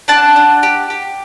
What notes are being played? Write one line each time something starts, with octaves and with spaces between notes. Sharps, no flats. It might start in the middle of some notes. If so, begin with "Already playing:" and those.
D4 F#5 A5
D4
G4
G4